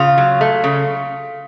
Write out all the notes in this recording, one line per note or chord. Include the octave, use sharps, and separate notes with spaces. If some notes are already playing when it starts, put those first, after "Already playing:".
Already playing: C#3 F4
F#3
A3
C#3